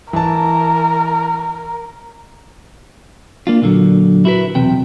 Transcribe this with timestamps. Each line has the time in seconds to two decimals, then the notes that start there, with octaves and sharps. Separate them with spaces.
0.13 E3 A#4 A5
3.47 A#3 D4 F4
3.62 A#2 D3 F#3
4.25 E4 F#4 G4 A#4 B4
4.55 B1 E2 C3 G5